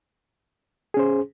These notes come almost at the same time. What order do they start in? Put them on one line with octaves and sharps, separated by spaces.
G#4 C#4 C5